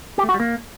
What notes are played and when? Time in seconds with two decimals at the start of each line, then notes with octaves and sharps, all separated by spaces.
0.18 G4
0.23 A3
0.29 F#4
0.34 G3
0.40 A#3